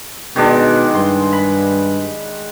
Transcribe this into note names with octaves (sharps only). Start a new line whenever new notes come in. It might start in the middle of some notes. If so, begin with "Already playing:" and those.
B2 D#3 G#3 D4
G2 C6
B5